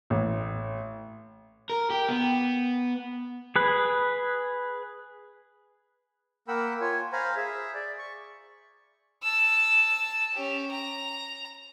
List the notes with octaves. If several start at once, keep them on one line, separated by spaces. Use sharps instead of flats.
A1
A#4
G4
B3
G#4 B4
A#3 A#4 F#5 G5 B5 E6
F4 C#5 G#5
C5 F5 G#5 A#5 B5
G#4 E5
D5
C#6
A5 E6
C#4 G4
A#5